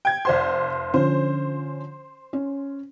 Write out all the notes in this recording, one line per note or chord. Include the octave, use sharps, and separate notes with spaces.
G5 G#6
F1 C5 D5 F#5 C6
D3 F3 C#4 C5
C#4